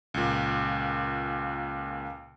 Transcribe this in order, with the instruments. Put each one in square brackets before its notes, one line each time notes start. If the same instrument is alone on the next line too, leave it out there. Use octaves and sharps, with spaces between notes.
[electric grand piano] C#2 A#2